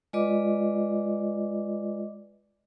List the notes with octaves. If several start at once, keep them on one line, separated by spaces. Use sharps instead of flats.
G#3 F4 B4 D5 D#5 D6